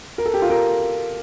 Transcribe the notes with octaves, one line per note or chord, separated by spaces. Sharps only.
A#4
A4
G4
F4
A#4